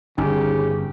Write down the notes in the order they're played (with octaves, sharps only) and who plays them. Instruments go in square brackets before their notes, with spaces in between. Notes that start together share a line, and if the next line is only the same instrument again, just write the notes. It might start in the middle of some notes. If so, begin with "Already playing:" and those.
[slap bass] G1 [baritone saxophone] C#3 [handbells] C#4 D#4 G#5 [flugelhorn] G4